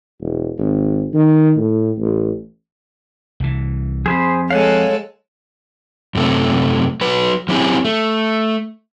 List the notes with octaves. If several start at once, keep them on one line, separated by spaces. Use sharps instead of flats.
E1
G#1
D#3
A2
A1
C2 E3
F3 C4 G#4 C5 B5
G#3 A4 C#5 F5 F#5 G#5
F#2 C3 A3
F#3 F#4 B4
F#3 C4 C#4 E4 G4 G#4
A3